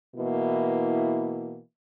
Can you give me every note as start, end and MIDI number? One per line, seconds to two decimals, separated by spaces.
0.16 1.58 47
0.16 1.58 52
0.16 1.58 58
0.16 1.58 64